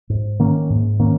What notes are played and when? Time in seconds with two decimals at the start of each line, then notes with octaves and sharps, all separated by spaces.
0.10 G#2
0.39 D#3 A#3 C#4
0.70 G#2
1.00 D#3 A#3 C#4